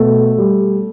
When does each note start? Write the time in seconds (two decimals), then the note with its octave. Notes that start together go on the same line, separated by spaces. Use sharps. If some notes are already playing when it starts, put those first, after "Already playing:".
Already playing: B2 A3 A4
0.38 G3